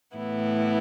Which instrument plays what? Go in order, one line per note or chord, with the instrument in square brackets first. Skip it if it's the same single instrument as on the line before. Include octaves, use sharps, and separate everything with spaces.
[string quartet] A2 E3 B3 E4